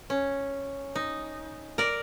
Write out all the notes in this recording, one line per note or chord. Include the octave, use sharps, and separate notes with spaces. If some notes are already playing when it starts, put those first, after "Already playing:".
C#4
D#4
A#4 D5